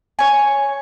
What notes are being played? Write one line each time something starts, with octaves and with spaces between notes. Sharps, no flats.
C#5 G#5